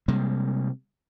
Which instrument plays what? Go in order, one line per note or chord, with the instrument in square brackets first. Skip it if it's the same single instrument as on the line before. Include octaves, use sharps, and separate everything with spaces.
[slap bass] C3 G3 G#3 A#3